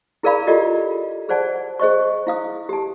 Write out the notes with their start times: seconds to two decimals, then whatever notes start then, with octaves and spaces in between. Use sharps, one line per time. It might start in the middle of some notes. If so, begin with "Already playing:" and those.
0.23 E4 G#4 A#4 D5 F5 B5
0.47 F4 G4 A4 D5 D#5
1.29 G#4 C5 D5 F#5 A5
1.80 G#4 C5 D#5 C#6
2.27 E4 F5 D#6
2.69 G4 A5